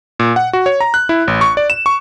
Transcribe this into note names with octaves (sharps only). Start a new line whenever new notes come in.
A#2
F#5
F#4
C#5
A#5
F#6
E4
A1
C#6
D5
E7
C#6